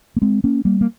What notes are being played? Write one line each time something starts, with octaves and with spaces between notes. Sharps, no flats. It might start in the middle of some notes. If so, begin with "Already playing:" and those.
A#3
G#3 C4
A#3 C#4
G3 A#3
A#3